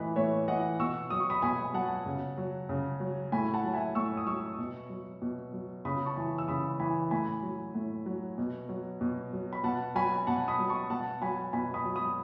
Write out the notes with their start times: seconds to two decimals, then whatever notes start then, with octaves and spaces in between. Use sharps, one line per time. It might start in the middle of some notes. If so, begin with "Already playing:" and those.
Already playing: A2 E3 B4 D#5
0.16 A2 C#5 E5
0.48 E3 D#5 F#5
0.79 B2 C#6 E6
1.10 F#3 D#6
1.20 C#6
1.30 B5 D#6
1.42 B2 G#5 B5
1.74 F#3 F#5 A5
2.06 C#3
2.38 F#3
2.69 C#3
3.00 F#3
3.32 A2 G#5 B5
3.54 F#5 A5
3.63 F#3
3.74 E5 G#5
3.95 A2 C#6 E6
4.17 D#6
4.26 F#3 C#6 E6
4.58 B2
4.90 F#3
5.22 B2
5.53 F#3
5.85 C#3 B5 D#6
6.05 A5 C#6
6.17 E3
6.38 E6
6.48 C#3 B5 D#6
6.79 E3 G#5 B5
7.11 A2 G#5 B5
7.43 F#3
7.74 A2
8.06 F#3
8.38 B2
8.69 F#3
9.01 B2
9.33 F#3
9.53 B5
9.63 B2 F#5 A5
9.95 F#3 G#5 B5
10.27 B2 F#5 A5
10.48 B5 D#6
10.59 F#3
10.69 A5 C#6
10.90 B2 F#5 A5
11.22 F#3 G#5 B5
11.53 B2 G#5 B5
11.74 B5 D#6
11.85 F#3
11.96 B5 D#6